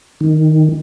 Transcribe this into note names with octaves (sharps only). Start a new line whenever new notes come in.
D#3